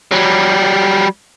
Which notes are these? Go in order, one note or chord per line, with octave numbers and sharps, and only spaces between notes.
F#3 G3